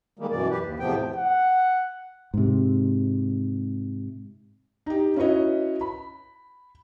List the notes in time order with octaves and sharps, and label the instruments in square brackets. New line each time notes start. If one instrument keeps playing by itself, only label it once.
[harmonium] D#3 G3 G#3 A#3
F#2 B2 E3 D5
G4 B4
D#2
E2 A2 C3 F3 B3 G5
[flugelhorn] F#5
[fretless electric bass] G#2 C3
[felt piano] D#4 G4
C#4 E4 F#4 B4 C#5 D#5
B5